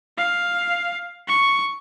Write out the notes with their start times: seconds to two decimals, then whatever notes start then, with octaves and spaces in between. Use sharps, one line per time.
0.18 F5
1.28 C#6